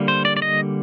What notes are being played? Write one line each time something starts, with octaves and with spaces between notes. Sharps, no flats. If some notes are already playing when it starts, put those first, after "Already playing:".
Already playing: D3 G3 A#3
C5
D5
D5
D#5